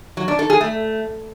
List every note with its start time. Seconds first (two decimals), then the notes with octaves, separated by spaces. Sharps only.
0.17 F#3
0.28 D4
0.39 A4
0.50 G#4
0.61 A3